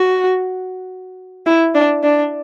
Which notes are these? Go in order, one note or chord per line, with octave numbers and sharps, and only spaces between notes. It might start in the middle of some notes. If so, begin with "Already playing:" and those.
Already playing: F#4
E4
D4
D4